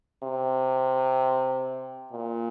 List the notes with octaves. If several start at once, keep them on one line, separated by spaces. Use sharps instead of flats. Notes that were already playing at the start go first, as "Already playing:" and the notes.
C3
A#2